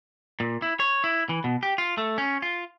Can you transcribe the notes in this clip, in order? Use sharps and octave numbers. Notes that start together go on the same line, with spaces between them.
A#2
E4
C#5
E4
E3
B2
G4
F4
A3
C#4
F4